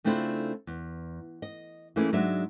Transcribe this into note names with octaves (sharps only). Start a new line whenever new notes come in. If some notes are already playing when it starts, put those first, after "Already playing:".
C#3 A3 C4 D4 E4 F4
E2
D#5
E3 A3 A#3 C#4 E4 G#4
G#2 F#3 G#3 D4 E5